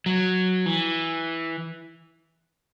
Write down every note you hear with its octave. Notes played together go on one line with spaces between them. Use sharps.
F#3
E3